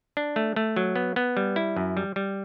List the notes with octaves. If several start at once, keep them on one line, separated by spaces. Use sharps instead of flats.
D4
A3
A3
F#3
B3
B3
G3
E4
F#2
G3
G3